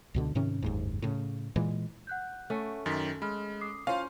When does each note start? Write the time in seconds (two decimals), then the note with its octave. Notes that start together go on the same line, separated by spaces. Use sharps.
0.14 C#2 B2 D3
0.35 G#2 C3 D#3 C#4
0.63 F#1 D#2 G#2
1.02 A2 C#3
1.56 A#2 E3 G#3
2.07 F#5 F#6 G6
2.50 A3 C#4
2.86 F#2 D#3 A6 B6
3.22 G#3 B5 F6
3.61 D6 D#6 C7
3.87 C#4 E4 F4 C5 C#5 F5